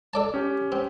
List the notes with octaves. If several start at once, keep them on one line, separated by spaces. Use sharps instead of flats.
A4 D5 A5
C#4 G4
C4